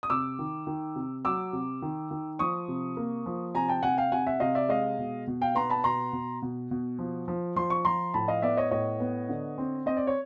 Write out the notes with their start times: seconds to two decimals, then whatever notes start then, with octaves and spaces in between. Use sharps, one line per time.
0.03 D#6
0.10 C3 D6 E6
0.39 D#3
0.67 D#3
0.96 C3
1.25 F#3 D6 E6
1.53 C3
1.82 D#3
2.11 D#3
2.39 F3 C#6 D#6
2.68 C3
2.97 A#3
3.26 F3
3.54 C3 G#5 A#5
3.68 G5 A5
3.83 C3 F#5 G#5
3.98 F5 G5
4.12 C3 F#5 G#5
4.27 E5 F#5
4.40 C3 D#5 F5
4.55 D5 E5
4.69 G#3 D#5 F5
4.99 B2
5.27 B2
5.41 F5 G5
5.55 B3 A#5 C6
5.70 A5 B5
5.84 B2 A#5 C6
6.13 B2
6.42 B2
6.71 B2
6.99 F3
7.28 F3
7.56 F3 C6
7.70 C#6
7.85 F3 A#5 C6
8.14 A2 A5 B5
8.28 D#5 F5
8.42 B3 D5 E5
8.57 C#5 D#5
8.71 A2 C#5 D#5
9.00 B3
9.29 D3
9.58 C4
9.86 C4 D#5
9.97 D5
10.07 C#5